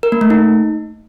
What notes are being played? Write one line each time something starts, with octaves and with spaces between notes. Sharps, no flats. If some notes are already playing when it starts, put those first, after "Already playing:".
A#4
A#3
A3
D#4